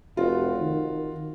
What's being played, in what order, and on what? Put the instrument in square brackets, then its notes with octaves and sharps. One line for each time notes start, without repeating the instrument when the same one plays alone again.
[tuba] F1 [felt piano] F4 F#4
[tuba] D#3